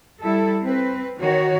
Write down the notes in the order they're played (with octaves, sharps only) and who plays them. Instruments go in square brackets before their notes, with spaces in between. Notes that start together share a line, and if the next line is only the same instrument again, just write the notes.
[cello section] G3 E4 A4
C4 B4
D#3 F#4 C#5